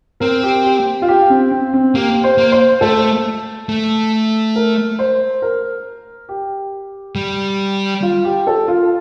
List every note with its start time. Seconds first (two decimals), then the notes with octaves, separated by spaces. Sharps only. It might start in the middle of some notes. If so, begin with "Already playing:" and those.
0.20 C4 A#4
0.43 G4
0.64 G4
1.02 F4
1.08 G4
1.30 C4
1.51 C4
1.74 C4
1.95 A#3 G4
2.24 C5
2.38 A#3
2.52 C5
2.81 A3 A4
3.69 A3
4.56 A#4
4.99 C5
5.42 A#4
6.29 G4
7.15 G3
8.02 F4
8.25 G4
8.47 A4
8.68 F4